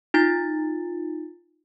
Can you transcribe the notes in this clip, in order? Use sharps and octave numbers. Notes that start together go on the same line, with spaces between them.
D#4 F4 A6